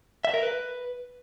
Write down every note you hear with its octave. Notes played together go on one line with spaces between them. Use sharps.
E5
A#4
B4